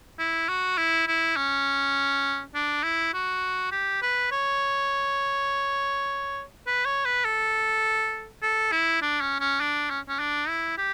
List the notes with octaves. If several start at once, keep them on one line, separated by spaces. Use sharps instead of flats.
E4
F#4
E4
E4
C#4
D4
E4
F#4
G4
B4
C#5
B4
C#5
B4
A4
A4
E4
D4
C#4
C#4
D4
C#4
C#4
D4
E4
G4